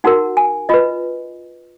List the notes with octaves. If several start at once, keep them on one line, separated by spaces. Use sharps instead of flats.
D#4 F#4 A#4 F#5
G#5
F4 B4 D#5